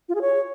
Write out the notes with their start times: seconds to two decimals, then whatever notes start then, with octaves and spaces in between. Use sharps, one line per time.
0.09 F4
0.15 G#4
0.21 C#5